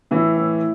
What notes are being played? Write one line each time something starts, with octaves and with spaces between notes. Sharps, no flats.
A2 E3 E4
A2